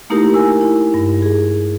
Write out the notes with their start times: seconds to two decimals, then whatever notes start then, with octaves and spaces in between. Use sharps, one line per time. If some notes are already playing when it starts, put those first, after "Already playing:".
0.10 A3 A#3 D#4 E4 G4 A#4
0.34 A#4 G#5 E6
0.61 E4
0.94 G2
1.22 G#4